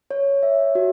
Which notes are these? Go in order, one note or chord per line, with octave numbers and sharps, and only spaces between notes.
C#5
E5
F#4